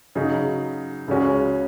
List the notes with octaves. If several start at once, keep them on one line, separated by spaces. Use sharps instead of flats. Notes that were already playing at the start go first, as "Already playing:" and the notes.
C#3 F#3 D#4
C#2 C#3 G#3 C#4 F#4